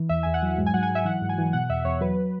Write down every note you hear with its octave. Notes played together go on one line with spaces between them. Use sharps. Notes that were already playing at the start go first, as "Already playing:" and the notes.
Already playing: E3
E2 E5
E2 G#5
F#5
F#3
G#2
G#5
F#3 F#5
G#5
F#3
E5
E3 F#5
G#2
G#5
E3
B2 F#5
E2 E5
E2 C#5
F#3 B4